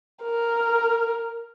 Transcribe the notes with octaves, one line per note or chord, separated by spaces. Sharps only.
A#4